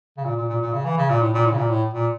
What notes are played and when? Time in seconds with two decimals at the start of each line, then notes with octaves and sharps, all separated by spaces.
0.17 C#3
0.25 A#2
0.36 A#2
0.49 A#2
0.61 A#2
0.73 C#3
0.85 E3
0.97 C#3
1.10 A#2
1.22 A2
1.34 A#2
1.46 A2
1.52 C#3
1.58 A#2
1.70 A2
1.94 A#2